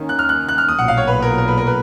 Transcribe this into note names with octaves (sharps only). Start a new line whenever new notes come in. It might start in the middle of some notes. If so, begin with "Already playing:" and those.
Already playing: D#2 D#3 A#3 C#4
F#6
F6
F#6
F#6
F6
D#6
B1 A#2 F#3 F#5
F5
C#5
B4
A#4
A#4
B4
A#4
B4